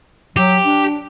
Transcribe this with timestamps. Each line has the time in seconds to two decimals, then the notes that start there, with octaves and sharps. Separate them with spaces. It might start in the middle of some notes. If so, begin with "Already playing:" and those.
0.37 F#3 G4
0.65 D4